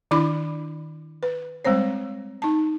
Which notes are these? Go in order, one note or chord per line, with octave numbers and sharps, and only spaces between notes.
D#3 D4 E4 B5 D6
B4
G3 G#3 C4 C5 C#5
D#4 A5